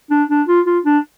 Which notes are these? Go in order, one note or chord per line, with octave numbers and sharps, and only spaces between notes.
D4
D4
F4
F4
D4